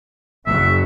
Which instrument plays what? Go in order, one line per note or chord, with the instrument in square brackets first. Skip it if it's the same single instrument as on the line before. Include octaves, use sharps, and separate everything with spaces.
[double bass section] F#1 F#3 [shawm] E5